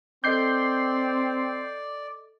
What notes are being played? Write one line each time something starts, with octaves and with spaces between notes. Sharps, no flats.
C4 A4 D5 D#5 D6 G6 C7